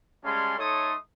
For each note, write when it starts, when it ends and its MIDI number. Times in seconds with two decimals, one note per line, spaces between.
0.24 0.56 55
0.24 0.56 56
0.24 0.56 61
0.24 0.56 77
0.24 0.56 81
0.24 0.56 84
0.58 0.93 57
0.58 0.93 63
0.58 0.93 69
0.58 0.93 73
0.58 0.93 84
0.58 0.93 87